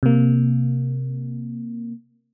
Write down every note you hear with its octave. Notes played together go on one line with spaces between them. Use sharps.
C3 A#3